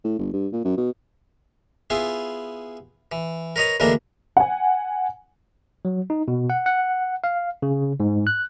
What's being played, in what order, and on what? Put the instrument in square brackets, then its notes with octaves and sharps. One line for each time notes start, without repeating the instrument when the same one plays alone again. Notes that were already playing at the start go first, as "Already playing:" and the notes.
[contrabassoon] A2
G1
G2
A#2
F#2
B2
[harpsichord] B3 E4 F4 G#4
E3
A#4 B4 C#5 D#5 A#5
D2 G#2 E3 A#3 D4 A#4
[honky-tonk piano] F#5 G#5
[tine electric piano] F#3
D#4
B2
F#5
F#5
F5
C#3
G#2
F#6